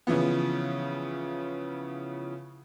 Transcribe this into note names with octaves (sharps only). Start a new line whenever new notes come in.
C#3 E3 F3 B3